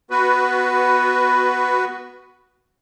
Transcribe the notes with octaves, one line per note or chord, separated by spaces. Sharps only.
B3 F#4 B4